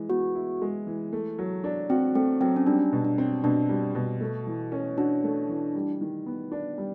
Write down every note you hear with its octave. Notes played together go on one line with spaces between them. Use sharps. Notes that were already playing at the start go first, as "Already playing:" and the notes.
Already playing: E3 G#3
B3 F#4
E4
G#3
E3
A3
F#3
D4
C4 F#4
A3 C4
F#3 C4
C#4
G3 D4
B2
D4
C4
B2 D4
G3
B2
A3
E3
C#4
D4 F#4
A3
E3
G3
D#3
B3
D4
G3